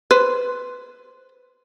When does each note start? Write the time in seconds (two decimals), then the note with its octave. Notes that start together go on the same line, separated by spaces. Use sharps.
0.11 B4 C5